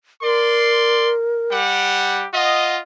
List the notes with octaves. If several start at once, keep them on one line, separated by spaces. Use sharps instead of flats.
A#4 D5 C6
G3 G4 F#5
F4 D#5 F#5